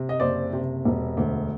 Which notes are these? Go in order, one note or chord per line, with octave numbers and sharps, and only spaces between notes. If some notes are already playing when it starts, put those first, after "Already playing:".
Already playing: C3
D#5
F#1 C5 D5
C3
E1
D2